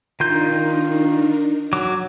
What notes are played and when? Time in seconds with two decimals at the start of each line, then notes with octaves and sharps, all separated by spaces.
0.20 D#3 D4 D#4 F4 A#4 G6
1.73 F#3 D6